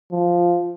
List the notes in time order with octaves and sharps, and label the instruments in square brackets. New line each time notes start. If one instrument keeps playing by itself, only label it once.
[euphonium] F3